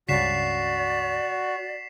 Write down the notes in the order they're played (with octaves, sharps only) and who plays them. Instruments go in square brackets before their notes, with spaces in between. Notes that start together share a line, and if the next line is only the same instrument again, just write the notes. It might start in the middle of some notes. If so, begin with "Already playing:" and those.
[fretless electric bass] C#2 G2 C#3 [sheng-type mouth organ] F#4 [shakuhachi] D5 [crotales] B6 C7 E7